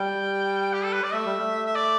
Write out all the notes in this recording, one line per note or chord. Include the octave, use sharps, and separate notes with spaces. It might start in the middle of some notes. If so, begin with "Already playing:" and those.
Already playing: G3 G5
G4
A4
B4
D5
A3 E5
G3
A3
E5
D5